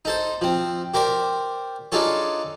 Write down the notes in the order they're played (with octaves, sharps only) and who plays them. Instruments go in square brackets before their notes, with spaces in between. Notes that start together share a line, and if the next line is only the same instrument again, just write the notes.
[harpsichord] D#4 A4 C5
F3 C4
G4 A#4 C5 D5
D4 D#4 F4 G#4 A4 C#5